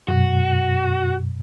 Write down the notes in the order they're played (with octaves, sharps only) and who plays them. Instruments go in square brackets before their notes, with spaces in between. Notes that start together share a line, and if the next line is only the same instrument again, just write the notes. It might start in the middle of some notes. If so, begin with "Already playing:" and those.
[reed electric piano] F#2 B2 [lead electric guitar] F#4